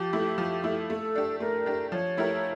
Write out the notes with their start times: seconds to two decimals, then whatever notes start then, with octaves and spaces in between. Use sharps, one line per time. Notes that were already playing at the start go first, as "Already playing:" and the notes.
Already playing: F3 G4
0.13 A3 E4
0.38 F3
0.64 A3 E4
0.90 A3 A4
1.15 D4 G4
1.40 A3 A#4
1.66 D4 G4
1.92 F3 C#5
2.17 A3 E4 G4 A#4